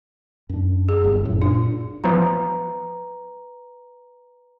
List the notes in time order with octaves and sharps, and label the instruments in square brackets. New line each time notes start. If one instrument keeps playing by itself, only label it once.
[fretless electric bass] F#2 D4
[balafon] G#4
[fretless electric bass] G1 G2
F#2 A2 C3
[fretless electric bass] A#2 [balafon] D4
[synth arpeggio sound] E3 F3 B3 [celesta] B4 A#5